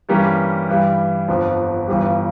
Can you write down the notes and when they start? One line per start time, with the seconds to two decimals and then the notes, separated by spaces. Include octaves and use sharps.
0.09 G2 E3 G3 A#3 C#4
0.69 G2 E3 G3
1.28 G1 F2 D3 F3
1.88 G1 G2 E3 G3